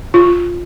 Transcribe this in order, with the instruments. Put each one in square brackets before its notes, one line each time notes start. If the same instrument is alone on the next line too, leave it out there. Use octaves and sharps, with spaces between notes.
[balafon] F4